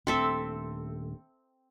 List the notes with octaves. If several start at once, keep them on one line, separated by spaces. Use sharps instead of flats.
D#1 A3 C4 D4 A4 E5